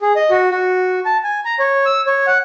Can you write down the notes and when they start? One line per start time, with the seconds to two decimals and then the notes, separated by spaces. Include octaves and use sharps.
0.01 G#4
0.16 D#5
0.30 F#4
0.51 F#4
1.06 A5
1.24 G#5
1.45 A#5
1.59 C#5
1.86 E6
2.07 C#5
2.27 F#5